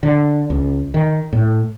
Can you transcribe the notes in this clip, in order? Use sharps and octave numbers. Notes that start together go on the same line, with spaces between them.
D3
C#2
D#3
A2